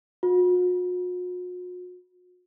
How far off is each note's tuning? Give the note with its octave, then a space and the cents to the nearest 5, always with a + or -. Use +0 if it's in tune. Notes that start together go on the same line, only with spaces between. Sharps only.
F#4 -45